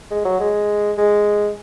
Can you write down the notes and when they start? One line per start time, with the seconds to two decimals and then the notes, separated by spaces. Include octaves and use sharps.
0.11 G#3
0.25 F#3
0.40 G#3
0.98 G#3